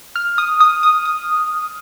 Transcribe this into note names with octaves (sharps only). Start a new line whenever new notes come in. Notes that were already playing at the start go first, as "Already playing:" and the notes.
F6
D#6
D#6
D#6
D#6